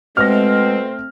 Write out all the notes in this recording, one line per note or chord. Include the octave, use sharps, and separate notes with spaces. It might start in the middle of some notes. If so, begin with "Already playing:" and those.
B2 G#3 A3 C4 F6 A#6